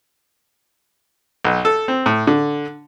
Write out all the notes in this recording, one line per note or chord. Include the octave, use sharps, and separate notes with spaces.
B1
A4
C4
A2
D3